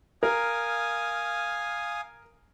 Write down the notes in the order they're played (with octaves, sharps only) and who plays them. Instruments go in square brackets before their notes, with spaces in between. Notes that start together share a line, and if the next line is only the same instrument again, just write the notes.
[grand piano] A#4 [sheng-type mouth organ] F5 G#5 D#6